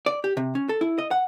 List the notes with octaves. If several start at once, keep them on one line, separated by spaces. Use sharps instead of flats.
D5
G4
C3
C#4
A4
E4
D#5
F#5